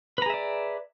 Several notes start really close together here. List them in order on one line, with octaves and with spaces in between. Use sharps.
B4 A#5 G#4 E5 D5